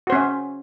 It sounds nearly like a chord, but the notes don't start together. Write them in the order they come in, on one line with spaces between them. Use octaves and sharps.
F#4 C5 C#4 E5